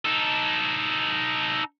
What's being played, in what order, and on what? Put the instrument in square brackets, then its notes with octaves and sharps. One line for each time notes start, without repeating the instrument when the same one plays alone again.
[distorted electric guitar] D#4 A4